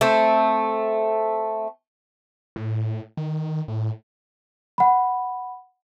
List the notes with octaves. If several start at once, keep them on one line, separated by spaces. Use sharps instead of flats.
A3 C4
A2
D#3
A2
F#5 B5